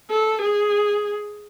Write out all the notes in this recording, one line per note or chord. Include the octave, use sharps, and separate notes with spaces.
A4
G#4